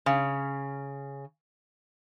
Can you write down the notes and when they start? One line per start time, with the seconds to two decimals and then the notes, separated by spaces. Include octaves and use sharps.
0.06 C#3 C#4